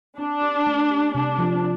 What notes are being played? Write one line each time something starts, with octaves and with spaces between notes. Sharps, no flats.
C4 D4
G4
A3
G4
C3 D4
F3